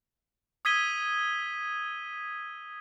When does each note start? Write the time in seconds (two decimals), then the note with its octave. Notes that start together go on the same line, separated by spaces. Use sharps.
0.65 D#6 E6 G#6 B6 D#7 G7